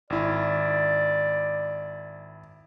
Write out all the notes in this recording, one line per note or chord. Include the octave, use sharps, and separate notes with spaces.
G#1 E4 D5